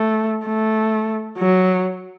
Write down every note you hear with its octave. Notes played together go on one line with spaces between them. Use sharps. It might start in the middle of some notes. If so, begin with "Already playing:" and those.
Already playing: A3
A3
F#3